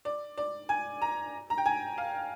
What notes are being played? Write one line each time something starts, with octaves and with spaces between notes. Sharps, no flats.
D5
D5
G#5
A#5
A#5
G5
G#5
F5